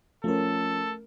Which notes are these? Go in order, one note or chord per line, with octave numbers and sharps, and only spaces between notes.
F3 A3 C#4 A4 A#4